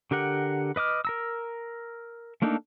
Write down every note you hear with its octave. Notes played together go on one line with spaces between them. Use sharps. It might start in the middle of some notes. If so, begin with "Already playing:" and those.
D3 G4 A#4 F#5
B4 D#5 D6 F6
A#4 A#5 E6
A3 A#3 D4 D#4 A4